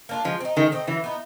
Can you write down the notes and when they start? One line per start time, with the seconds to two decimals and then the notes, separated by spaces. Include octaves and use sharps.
0.09 A#3 D4 F4
0.25 F3 G#3
0.40 C4
0.45 D#4
0.56 D#3 G#3
0.72 C4 D#4
0.87 E3 F#3
1.04 B3 D#4